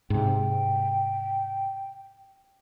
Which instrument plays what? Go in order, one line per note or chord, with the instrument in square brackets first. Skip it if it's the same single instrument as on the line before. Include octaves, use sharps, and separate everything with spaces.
[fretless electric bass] G#2 C3 [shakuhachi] G5